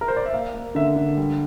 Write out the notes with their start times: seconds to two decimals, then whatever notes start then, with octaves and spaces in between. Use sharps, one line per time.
0.01 A#4
0.08 C5
0.16 D5
0.26 E5
0.34 A#3 F5
0.54 A#3
0.75 D3 E5
0.96 D3
1.17 G3